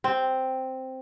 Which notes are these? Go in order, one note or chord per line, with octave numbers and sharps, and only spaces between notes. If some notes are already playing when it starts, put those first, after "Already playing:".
C4